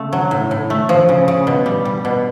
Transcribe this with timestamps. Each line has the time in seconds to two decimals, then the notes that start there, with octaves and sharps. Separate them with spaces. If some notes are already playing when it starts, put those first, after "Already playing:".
Already playing: C#3 A3
0.13 F#3
0.31 A2
0.51 A2
0.70 A3
0.89 F3
1.09 C#3
1.28 C#3
1.47 B2
1.66 G3
1.85 G3
2.05 B2